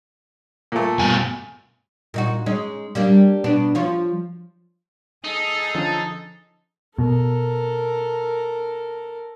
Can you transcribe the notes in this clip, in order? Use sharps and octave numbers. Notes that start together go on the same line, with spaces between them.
A#2 A3
G2 B2 G#5
A#2 D#4 F#4
G#3 C#4 D#4
G3 A#3 D4
B2 B3 D4
F3 F4 C#5
D#4 G#4 A4
D3 F3 C#4 A5
B2 A4 A#4